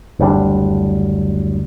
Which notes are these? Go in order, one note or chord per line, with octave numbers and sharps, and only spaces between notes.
F#1 D2 G3 D4